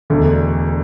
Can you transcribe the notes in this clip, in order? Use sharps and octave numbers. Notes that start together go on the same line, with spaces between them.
E1 D2 D3